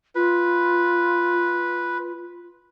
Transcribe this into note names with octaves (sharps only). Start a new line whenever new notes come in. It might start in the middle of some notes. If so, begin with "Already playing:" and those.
F4 B4